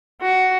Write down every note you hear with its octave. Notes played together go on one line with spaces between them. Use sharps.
F#4